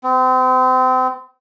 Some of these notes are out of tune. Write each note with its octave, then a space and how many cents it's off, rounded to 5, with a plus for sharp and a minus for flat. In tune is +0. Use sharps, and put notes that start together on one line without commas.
C4 -35